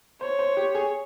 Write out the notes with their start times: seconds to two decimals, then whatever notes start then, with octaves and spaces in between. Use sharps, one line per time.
0.21 C5 C#5
0.39 C5
0.57 G4
0.75 G#4